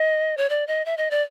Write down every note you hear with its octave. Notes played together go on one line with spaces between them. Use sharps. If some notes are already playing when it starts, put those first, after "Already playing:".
Already playing: D#5
C#5
D5
D#5
E5
D#5
D5